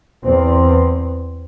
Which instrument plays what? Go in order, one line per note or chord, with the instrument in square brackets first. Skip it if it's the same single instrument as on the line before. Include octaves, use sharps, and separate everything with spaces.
[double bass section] E2 C4